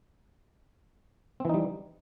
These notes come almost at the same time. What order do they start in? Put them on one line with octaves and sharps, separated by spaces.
C4 E3 D#4 G3